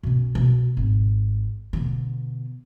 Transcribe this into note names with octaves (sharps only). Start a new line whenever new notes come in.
B2 C#4
B2
G#1
B2 D3